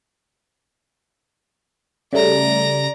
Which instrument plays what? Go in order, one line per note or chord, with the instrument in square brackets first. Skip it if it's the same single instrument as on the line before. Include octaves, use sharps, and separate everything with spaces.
[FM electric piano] C#3 G3 A3 [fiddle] D5 A#5